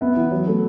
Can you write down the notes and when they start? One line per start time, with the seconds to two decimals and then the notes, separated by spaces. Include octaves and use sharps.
0.01 B3 E5
0.16 E3
0.31 F#3
0.47 A3